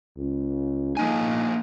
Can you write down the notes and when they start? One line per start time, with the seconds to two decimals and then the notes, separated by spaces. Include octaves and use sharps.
0.17 C#2
0.97 F3 A#3 D#4 G#5